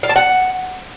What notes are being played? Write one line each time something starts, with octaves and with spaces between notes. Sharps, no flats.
F5
A5
F#5